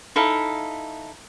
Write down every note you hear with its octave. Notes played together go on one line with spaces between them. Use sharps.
D#4 E4 A4 F5